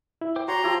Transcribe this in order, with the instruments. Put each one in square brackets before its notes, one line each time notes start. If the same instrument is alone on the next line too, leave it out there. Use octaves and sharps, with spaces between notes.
[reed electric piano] E4
[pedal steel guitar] C5 G5 D6
[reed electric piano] F#4 [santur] C#5 [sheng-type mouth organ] A#5 C6
[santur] F3 E4 G4